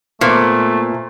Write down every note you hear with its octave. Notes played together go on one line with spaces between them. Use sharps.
A#2 A3 B3 F4 C5